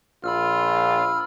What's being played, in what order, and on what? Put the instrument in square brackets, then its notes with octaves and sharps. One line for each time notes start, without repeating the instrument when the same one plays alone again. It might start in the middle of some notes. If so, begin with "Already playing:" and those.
[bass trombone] A#1 [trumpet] F4 [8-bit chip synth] B5 E6 F6